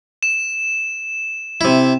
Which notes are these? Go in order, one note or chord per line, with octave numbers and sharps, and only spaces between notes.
E7
C3 E4